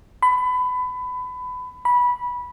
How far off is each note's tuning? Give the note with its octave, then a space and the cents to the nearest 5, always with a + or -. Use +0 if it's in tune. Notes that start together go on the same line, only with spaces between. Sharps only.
B5 +25
B5 -15